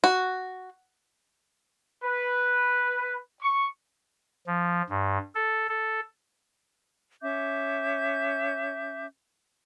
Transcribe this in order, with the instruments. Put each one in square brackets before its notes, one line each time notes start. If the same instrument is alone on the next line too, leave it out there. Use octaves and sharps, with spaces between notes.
[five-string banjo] F#4
[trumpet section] B4
C#6
[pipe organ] F3
G2
A4
A4
[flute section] C#4 E5 D6 G6